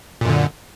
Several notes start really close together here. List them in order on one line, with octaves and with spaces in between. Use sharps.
A#2 F#2 D3